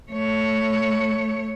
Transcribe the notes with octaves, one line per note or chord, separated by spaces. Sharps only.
A3 C#5